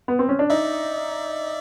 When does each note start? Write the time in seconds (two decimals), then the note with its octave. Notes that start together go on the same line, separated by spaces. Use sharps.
0.08 B3
0.19 C4
0.29 C#4
0.39 D4
0.50 D#4 D5 E5